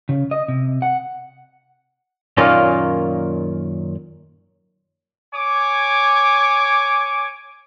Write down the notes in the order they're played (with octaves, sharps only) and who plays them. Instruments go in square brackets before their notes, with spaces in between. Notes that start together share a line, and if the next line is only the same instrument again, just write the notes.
[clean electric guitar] C#3
D#5
C3
F#5
[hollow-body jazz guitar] F#2 A#2 D#3 A#3 C#4 F4
[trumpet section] C#5 G#5 D6